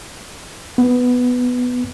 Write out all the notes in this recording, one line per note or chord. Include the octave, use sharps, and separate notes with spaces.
B3